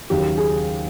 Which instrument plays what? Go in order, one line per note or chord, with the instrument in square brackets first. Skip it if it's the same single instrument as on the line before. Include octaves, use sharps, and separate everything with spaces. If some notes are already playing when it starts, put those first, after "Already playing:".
[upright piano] D#2 C#3 F#3 [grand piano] G4
[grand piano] G#4